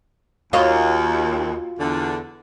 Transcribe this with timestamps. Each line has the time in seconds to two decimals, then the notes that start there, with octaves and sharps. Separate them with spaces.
0.53 D#2 F4 F#4 D#5
1.80 E2 D3